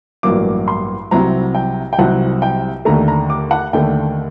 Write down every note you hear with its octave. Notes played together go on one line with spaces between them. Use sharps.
A1 G2 F#3 A#3 D6
C6
C2 C3 F#3 C4 A#5
G5
G5
C2 C3 F#3 C4 F#5
G5
D#2 D3 A3 A#5
A#5
D6
F#5
D#2 D3 A3 G5